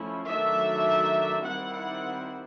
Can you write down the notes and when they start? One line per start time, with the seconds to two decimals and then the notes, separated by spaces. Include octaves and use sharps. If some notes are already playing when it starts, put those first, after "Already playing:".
Already playing: F3 A3 C#4 E4
0.27 D#3 F#3 A3 D4 E5
1.43 D#3 G3 C4 E4 F#5
1.72 F#5